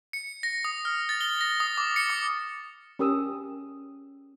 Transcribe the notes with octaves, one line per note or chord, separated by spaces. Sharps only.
C#7
A#6
D#6
F6
A6
G7
A#6
D#6
D6
C#7
D6
C#4 G4 A#4 D#6 E6